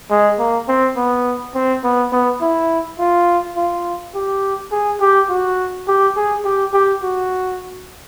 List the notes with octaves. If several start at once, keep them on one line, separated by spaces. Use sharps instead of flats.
G#3
A#3
C4
B3
C4
B3
B3
E4
F4
F4
G4
G#4
G4
F#4
G4
G#4
G4
G4
F#4